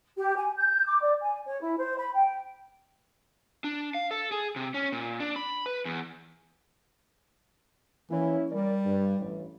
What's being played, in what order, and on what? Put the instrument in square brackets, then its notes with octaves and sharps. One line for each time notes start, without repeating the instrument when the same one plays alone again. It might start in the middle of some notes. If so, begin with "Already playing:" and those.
[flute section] G4
G#5
G6
D6
D5
G#5
C#5
E4
C5
B5
G5
[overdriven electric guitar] D4
F5
A4
G#4
C3
C#4
A#2
D4
B5
B4
E2
[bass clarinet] E3 [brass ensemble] A#3 C#4 E4
[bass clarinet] G3 [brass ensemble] A#4 D5
[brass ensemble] G2
A1